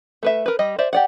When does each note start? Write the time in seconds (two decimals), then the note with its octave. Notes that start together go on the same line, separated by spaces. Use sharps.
0.23 A3 B4 E5
0.46 A#4 B4
0.59 G3 D#5
0.78 C5 D5 E5
0.93 G4 D5 F#5